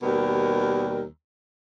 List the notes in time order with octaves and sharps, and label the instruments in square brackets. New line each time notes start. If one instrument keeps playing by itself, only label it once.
[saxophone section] D#2 B2 G3 B3 A#4